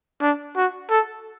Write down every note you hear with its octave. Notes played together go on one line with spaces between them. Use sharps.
D4
F#4
A4